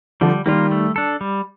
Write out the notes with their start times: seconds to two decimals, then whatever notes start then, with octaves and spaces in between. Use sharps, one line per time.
0.21 D3 F3 G3
0.46 D#3 G3 A#3 F4
0.71 A3
0.96 D4 A4
1.21 G3